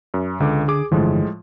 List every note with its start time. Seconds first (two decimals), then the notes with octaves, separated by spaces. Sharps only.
0.14 F#2
0.40 C#2 D3 A4 D6
0.68 G#4 D6
0.91 G1 A2 D3 E3 F3 G#3